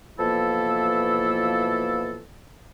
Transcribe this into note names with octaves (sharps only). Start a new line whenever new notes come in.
B2 E3 F3 A#3 E4 A4